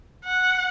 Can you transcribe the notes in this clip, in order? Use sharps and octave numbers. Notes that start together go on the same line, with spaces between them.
F#5